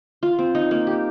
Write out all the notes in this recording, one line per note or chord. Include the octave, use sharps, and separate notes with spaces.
F4
C4
D#4
A#3
G4